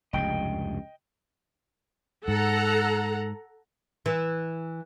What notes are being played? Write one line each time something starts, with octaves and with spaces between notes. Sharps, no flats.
F1 C#2 G2 D#5 G5
G#2 A4 F#5 A#5
E3